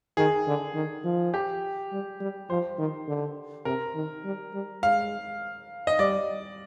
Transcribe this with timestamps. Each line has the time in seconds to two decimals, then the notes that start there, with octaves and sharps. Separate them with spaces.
0.17 D#3 G#4
0.47 D3
0.75 D#3
1.04 F3
1.34 G4
1.92 G3
2.20 G3
2.50 F3 C5
2.78 D#3
3.08 D3
3.65 C3 A#4
3.95 D#3
4.25 G3
4.53 G3
4.82 G#3 F5
5.87 D#5
5.99 G3 D5